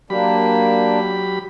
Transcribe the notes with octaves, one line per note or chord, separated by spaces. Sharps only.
F#3 A#3 D4 G4 B5